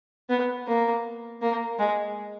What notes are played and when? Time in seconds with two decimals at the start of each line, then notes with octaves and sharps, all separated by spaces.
0.29 B3
0.68 A#3
1.42 A#3
1.79 G#3